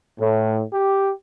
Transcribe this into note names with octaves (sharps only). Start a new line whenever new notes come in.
A2
G4